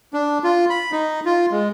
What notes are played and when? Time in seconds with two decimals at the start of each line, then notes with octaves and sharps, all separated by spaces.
0.13 D4
0.44 F4
0.70 B5
0.92 D#4
1.26 F4
1.51 G#3